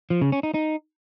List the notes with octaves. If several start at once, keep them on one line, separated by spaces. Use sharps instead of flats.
F3
C#3
C#4
D#4
D#4